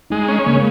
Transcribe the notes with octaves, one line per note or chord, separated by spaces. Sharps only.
G#3 D#4
C#4
C#3 A#3
G#3